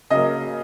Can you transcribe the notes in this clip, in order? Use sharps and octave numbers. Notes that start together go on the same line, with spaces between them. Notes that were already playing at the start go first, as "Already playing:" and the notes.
C#3 F#3 A#3 D#5